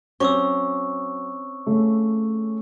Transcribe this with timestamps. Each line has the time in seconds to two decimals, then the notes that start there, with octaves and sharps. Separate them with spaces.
0.20 F#3 C4 C#4 C#6 D6 E6
1.66 C#3 A3